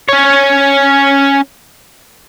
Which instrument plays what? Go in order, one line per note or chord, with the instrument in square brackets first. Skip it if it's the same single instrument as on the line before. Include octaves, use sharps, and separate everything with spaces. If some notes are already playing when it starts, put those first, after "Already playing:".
[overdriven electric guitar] C#4 C#5